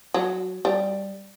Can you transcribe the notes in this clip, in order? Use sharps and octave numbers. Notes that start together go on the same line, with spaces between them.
F#3
G3